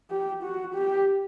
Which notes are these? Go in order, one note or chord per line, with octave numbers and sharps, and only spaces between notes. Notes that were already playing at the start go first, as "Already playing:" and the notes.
G4
F#4
G4